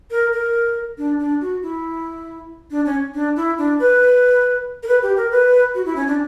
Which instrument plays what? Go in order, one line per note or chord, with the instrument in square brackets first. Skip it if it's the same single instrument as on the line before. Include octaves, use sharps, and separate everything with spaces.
[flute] A#4
A#4
D4
D4
F#4
E4
D4
C#4
D4
E4
D4
B4
A#4
B4
G4
A#4
B4
F#4
E4
C#4
D4